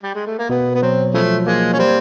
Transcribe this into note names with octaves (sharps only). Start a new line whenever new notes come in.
G3
G#3
A3
A#3
B2 B3
B3
F#3 C4
C#3 F3 A3
G#3 A#3
C#4
G3 C4